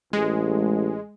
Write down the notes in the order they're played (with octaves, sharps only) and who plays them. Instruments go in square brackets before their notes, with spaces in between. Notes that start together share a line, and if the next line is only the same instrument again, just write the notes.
[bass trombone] A1 [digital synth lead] G#3